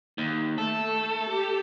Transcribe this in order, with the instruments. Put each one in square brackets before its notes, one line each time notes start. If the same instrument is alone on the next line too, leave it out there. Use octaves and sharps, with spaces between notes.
[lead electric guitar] D#2
[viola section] A3 [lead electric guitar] A4
[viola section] G4